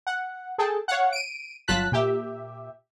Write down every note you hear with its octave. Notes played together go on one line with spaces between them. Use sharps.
F#5
G#4 A4 G5 A5
C#5 F5 F#5
D7 D#7
G1 F#3 F4 A5 F#6 B6
A#2 G4 E5